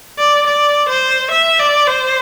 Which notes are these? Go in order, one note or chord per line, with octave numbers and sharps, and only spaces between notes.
D5
D5
C5
E5
D5
C5